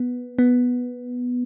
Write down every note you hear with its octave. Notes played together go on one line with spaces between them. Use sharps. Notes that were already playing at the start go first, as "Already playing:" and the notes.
Already playing: B3
B3